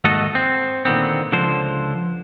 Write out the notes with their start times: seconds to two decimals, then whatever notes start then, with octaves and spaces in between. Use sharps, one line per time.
0.04 D#2 G#2 A3 F#4 A4 D#5
0.35 C4
0.85 A#2 D3 D#3 B3 C4
1.32 C#2 D3 F3 C5